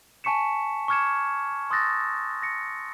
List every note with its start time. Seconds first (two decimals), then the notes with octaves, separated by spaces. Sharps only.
0.24 G#5 A5 C#6 B6 C#7 E7
0.88 C#6 D6 F6 G#6 C#7 E7
1.70 C6 D#6 E6 F#6 A6 A#6
2.43 A#6 C#7